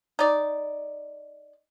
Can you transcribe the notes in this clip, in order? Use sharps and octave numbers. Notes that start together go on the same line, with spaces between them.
D#4 D5